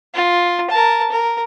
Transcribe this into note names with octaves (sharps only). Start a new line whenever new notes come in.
F4
A#4 A5
A#4